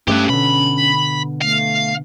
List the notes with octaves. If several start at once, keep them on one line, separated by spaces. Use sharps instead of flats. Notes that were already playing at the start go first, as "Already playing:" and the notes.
G2 G#3 A3 C#4 G4 B4
B2 D3 B5
A3 F5